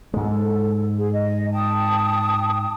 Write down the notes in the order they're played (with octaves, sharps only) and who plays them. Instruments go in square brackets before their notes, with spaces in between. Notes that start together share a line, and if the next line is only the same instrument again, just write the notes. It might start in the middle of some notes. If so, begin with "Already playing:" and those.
[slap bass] G#2 G#3 [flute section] A4
[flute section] G#4
D#5
G5 A5 D#6